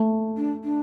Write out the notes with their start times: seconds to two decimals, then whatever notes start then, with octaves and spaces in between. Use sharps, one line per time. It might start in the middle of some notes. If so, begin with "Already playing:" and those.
Already playing: A3
0.37 D4
0.64 D4